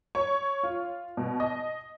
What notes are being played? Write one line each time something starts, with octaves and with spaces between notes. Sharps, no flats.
C#5
F4
B2
D#5